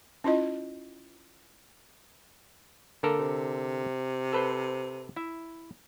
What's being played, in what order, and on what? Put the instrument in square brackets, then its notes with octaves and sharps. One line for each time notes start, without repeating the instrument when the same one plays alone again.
[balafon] C#4 E4 F4 D#5
[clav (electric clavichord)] D3 A4 A#4 [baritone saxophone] A#3
[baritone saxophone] C3
[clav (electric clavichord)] A4 B4 C5
E4 E5